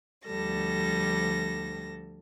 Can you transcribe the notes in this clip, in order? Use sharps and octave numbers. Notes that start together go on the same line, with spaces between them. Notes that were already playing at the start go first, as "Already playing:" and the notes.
D2 F3 G3 A4 A#6